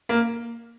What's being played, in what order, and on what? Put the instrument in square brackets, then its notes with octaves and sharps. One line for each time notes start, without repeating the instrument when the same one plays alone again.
[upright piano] A#3